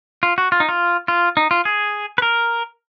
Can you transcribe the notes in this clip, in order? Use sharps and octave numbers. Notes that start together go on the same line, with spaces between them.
F4
F#4
F4
D#4
F4
F4
D#4
F4
G#4
B4
A#4